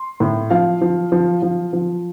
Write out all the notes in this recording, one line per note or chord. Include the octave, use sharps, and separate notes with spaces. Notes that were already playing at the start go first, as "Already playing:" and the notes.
Already playing: C6
A2
F3 F5
F3
F3
F3
F3